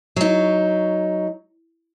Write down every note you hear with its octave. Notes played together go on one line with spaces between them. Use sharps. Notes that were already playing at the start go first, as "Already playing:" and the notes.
F#3 D#4